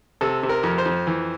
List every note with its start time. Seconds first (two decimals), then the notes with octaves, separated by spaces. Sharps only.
0.21 C3 A4
0.43 C3
0.49 A#4
0.63 F2
0.78 C5
0.85 F2
1.07 E3